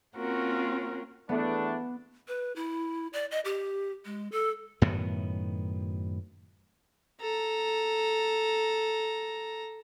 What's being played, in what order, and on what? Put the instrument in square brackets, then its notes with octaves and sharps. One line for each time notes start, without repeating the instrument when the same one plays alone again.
[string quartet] A#3 C4 C#4 F4 F#4 A#4
[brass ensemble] E2 A3 D4 [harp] B3
[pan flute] B4
E4
D5
D#5
G4
G#3
A4
[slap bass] F#2 A2 D#3 B3
[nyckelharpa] A4 A#5